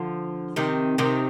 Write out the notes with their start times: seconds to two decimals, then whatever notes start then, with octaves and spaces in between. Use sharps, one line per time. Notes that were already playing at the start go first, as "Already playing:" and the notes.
Already playing: D3 F3
0.56 C3 D#3
0.98 C3 D#3